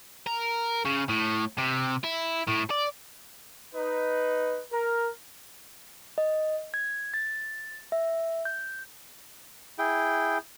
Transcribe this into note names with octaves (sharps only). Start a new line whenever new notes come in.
A#4
C#3
A2
C3
E4
A2
D5
D#4 B4
A#4
D#5
G#6
A6
E5
G6
E4 G#4 G5